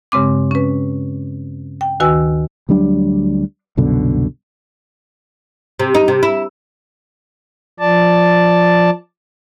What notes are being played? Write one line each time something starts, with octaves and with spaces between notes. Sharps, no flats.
G2 C#3 G#3 C4 D6
C#4 B4
G5
D2 D#3 F#4 B4 G#5 E6
D2 F#3 G3 D4
C2 F#2 B2 D3
C3
D#4
C3
E4
F3 D5 A5